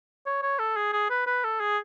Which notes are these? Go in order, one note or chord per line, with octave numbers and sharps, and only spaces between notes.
C#5
C#5
A4
G#4
G#4
B4
B4
A4
G#4